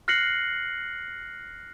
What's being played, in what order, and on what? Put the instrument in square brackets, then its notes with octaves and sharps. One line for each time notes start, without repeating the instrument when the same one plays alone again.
[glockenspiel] F6 F#6 A#6 C7 C#7 F#7